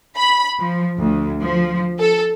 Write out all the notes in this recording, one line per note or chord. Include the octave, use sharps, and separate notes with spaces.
B5
F3
D2
F3
A4